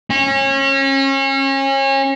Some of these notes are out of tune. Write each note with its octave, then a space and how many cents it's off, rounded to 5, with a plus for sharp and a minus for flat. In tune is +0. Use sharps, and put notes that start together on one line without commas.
C#4 -30